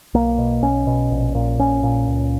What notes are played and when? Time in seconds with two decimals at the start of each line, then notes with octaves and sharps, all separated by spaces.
0.14 B1 A#3
0.38 B2
0.63 B1 C#4
0.87 B2
1.11 A#1
1.35 A#2
1.59 A#1 C#4
1.83 A#2
2.07 C#2